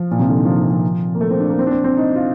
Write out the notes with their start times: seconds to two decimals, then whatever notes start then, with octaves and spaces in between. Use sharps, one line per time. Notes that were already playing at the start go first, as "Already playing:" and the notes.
Already playing: F3
0.11 A#2
0.19 C3
0.28 D3
0.37 D#3
0.45 F3
0.57 D#3
0.70 F3
1.15 A#3
1.21 A3
1.30 C4
1.40 D4
1.50 A#3
1.59 C4
1.67 D4
1.71 C4
1.84 C4
1.97 D#4
2.16 F4